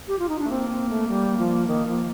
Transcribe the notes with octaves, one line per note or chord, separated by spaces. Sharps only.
G4
F4
D#4
D4
A3
A#3 C4
C4
A3
G3
F3
D#3
F3